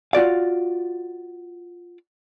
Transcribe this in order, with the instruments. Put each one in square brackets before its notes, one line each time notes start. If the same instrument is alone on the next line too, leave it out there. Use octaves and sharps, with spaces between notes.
[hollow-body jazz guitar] F4 F#4 D5 F5